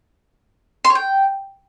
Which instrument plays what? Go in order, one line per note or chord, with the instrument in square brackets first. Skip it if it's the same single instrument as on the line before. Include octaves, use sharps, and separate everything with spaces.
[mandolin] C6
C#5
G5